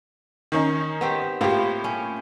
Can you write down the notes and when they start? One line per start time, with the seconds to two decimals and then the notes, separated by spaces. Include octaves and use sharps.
0.52 D#3 C#4 D#4
1.01 B3 C4 G4
1.41 A2 A#3 C4 F4 G4
1.84 C#4